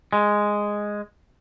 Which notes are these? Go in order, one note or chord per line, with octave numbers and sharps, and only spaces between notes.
G#3